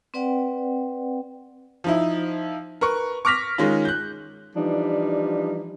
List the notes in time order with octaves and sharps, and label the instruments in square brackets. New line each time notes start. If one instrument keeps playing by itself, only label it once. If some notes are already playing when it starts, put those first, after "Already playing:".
[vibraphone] C4 B4 D5 F#5 G5
[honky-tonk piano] F3 D#4 E4
A#4 B4 C#6
C#6 D6 F6 A#6 B6 F7
D#3 G#3 C#4 F4
F#6 G6
[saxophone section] E3 F3 G3 D4 D#4